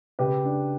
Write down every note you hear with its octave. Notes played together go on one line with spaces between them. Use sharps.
C#3 G4 B4
D4